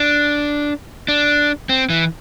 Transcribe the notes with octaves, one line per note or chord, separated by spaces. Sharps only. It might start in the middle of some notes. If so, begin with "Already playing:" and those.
Already playing: D4
D4
C4
E3